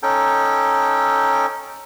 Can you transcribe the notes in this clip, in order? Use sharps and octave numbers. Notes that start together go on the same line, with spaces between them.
C#4 D#4 A4 G5